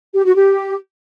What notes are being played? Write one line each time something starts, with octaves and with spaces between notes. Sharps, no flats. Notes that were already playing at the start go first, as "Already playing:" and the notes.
G4
F#4
G4